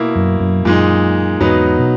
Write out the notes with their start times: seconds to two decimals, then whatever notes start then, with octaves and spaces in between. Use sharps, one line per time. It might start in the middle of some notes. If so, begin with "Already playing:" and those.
Already playing: B2 A#3 E4
0.15 F#2
0.40 F#2
0.65 F#2 A#2 G#3 D#4
1.40 E2 G#2 F#3 B3 D#4
1.79 B2